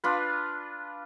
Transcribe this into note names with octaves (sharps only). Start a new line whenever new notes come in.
D4 F4 B4